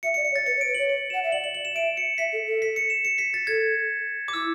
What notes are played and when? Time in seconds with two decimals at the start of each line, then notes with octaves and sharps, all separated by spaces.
0.03 E5 C#7
0.14 C#7
0.17 D5
0.25 C#7
0.32 C#5
0.36 A6
0.46 B4 C#7
0.56 C#5
0.61 D7
0.67 B4
0.75 C#5 F#7
0.89 F#7
1.10 F#5 E7
1.23 E5
1.32 D5 F#7
1.44 F#7
1.54 F#7
1.65 E7
1.75 E5 D7
1.97 C#7
2.18 E5 B6
2.32 A4
2.47 A4
2.62 B6
2.76 C#7
2.90 E7
3.05 C#7
3.18 B6
3.34 A6
3.47 A4 G#6
4.28 D6
4.33 E4 E6